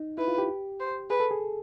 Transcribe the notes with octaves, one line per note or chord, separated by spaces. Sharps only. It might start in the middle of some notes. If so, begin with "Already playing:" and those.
Already playing: D#4
E4 B4
F4
G4
C5
G#4 B4
A4
G#4